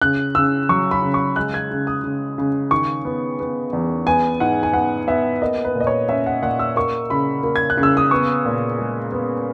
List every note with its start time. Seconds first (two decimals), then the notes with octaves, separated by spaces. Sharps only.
0.01 C#3 F#6
0.35 C#3 E6
0.69 F#3 C#6
0.91 B5
1.02 C#3
1.14 C#6
1.36 G#3 F#6
1.54 G#6
1.71 C#3
1.87 D#6
2.04 C#3
2.38 C#3
2.71 D#3 C#6
3.05 B3
3.40 B3
3.73 E2
4.06 B3 G#5
4.40 G#2 F#5
4.63 G#5
4.73 B3 F#5
5.08 B3 E5
5.42 A#3 D#5
5.65 B4
5.75 A#2
5.81 D#5
5.87 C#5
6.09 C#4 E5
6.26 F#5
6.42 A#2 F#5
6.59 E6
6.76 A#3 C#6
7.10 C#3 B5
7.43 A#3
7.56 G#6
7.70 F#6
7.77 C#3
7.83 E6
7.97 D#6
8.11 B3 C#6
8.45 A#2
8.79 G#3
9.12 B3